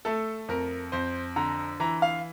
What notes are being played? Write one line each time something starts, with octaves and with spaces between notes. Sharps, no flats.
A3 A4
F2 A#4
F2 C5
D3 A#5
E3 A#5
F5